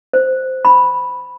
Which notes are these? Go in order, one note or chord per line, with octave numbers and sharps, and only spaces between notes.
C5
B5